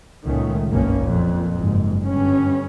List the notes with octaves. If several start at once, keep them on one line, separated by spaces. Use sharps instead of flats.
C#2 A#2 D#3 A3 C#4
F#1 B1 G2 C#3 A#3 C#4
F2 A#2
F#1 G#2
G1 G2 C#4